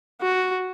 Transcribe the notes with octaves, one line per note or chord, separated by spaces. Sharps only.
F#4